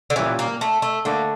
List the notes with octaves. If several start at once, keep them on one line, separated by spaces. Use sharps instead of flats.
D3
A#2 E3 G3 C#4
A#3
A3
A3
D3 A3 A#3 D4 A4